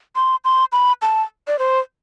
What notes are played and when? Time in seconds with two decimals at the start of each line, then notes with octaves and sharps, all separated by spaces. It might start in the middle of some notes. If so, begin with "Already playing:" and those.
0.16 C6
0.45 C6
0.72 B5
1.02 A5
1.48 D5
1.59 C5